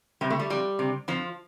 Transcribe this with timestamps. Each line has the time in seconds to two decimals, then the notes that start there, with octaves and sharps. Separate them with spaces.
0.21 C3 G3
0.30 A3
0.39 G3
0.50 F2 G3
0.79 C3
1.08 F2 F3